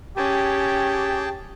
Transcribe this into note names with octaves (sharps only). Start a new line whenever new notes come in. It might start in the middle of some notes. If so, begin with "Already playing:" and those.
C#4 G4 G#4 G5 A5